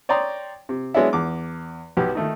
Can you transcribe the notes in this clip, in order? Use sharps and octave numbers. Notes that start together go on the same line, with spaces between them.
C#5 D5 G5 A#5 C6 D#6
C3
F#3 G#3 B3 C#4 D4 E4
E2 D6
B1 B3 G4
D#3 A3 D#4